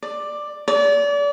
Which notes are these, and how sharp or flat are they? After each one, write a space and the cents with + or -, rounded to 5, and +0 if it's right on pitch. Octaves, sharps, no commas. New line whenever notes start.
D5 +10
D5 -35